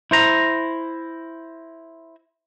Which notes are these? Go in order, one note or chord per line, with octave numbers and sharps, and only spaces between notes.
E4 C5 A#5